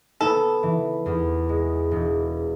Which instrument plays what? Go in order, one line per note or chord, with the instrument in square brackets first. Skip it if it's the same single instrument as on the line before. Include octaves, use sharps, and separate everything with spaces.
[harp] B3 [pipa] A4
[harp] E3
E2
G#3
E1